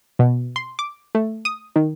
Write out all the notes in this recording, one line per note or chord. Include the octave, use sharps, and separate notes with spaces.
B2
C6
D6
A3
D#6
D#3